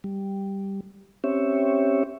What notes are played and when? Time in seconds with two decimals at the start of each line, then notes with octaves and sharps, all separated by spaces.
0.04 G3
1.24 C4 C#4 G4 C#5 E5